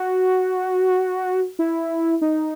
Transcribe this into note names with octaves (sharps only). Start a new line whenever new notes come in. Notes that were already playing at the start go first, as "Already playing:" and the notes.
Already playing: F#4
E4
D#4